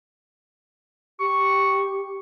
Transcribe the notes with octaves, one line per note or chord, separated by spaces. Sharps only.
G4 C#6